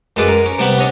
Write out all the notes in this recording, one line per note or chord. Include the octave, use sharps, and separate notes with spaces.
F#2 G#3 G#4 A4 B4 D6
A#4
C#4
C3 G3 B3 B5
C#4 D4 C#5 D#5